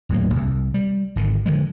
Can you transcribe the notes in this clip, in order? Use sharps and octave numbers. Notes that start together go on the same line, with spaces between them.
D#1 A2 F#3 A#3
C2
G3
G#1 D3 D#3
D3 D#3 F3 G#3